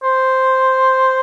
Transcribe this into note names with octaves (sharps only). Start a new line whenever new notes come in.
C5